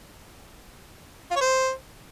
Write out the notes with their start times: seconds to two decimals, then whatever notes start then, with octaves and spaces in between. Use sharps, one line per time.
1.31 F4
1.36 C#5
1.41 C5